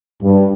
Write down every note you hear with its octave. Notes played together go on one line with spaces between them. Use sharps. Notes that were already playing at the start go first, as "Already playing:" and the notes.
G2